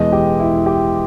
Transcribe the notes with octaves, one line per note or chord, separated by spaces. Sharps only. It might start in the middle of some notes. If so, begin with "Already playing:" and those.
Already playing: E2 B2 G#3 B3 D#5
G4
E4
G4